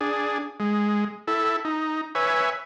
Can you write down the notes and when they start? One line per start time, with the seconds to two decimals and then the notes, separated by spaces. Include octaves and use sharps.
0.01 D4 G#4
0.60 G#3
1.27 E4 A4
1.65 D#4
2.15 B4 C#5 E5 G#5